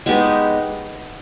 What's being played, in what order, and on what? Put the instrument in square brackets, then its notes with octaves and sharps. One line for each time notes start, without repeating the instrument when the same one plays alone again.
[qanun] G#3 B3 D#4 G4